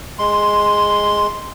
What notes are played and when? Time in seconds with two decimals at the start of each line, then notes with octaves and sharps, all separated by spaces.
0.19 G#3 C6